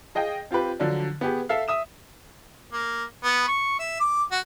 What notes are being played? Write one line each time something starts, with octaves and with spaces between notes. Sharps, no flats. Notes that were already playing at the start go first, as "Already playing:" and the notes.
G#4 D#5 F5 G5
C4 F4 G4 B4
D3 F3 F#3 D4
B3 G4 G#4
A4 E5 F5
E5 D#6 E7
A#3
B3
C#6
E5
D6
F#4